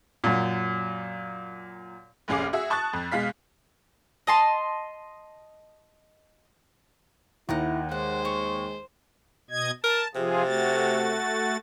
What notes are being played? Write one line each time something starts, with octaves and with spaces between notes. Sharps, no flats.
F#2 A#2
F1 A#1 C#4 G#4 F5 D6
F#4 G#4 E5
A5 C#6 D#6 F#6 A6
F2
B2 G#3 F5 B6
D#5 A5 C6
D#2 D#4 E4 A#4 F#5
G#3 C5 F#5
C#5 C#6
B2 D#5 G#6
A#4 A5
C3 F3 F4 G#4
A3 F#4 A6